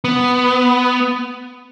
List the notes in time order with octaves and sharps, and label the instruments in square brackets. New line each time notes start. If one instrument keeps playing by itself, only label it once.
[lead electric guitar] B3